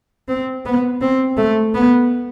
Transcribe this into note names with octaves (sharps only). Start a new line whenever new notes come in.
C4
B3
C4
A3
B3